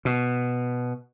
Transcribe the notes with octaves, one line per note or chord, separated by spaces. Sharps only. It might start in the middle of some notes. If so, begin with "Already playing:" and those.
B2